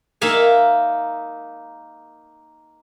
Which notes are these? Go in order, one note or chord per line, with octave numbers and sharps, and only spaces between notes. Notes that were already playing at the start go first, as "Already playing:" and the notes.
A#3 D#4 E5 F5 G#5